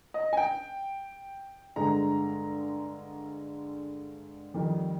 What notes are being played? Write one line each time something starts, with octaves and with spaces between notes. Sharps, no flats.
D#5
G#5
G5
G2 D3 G#3 A#5
F2 D#3 G3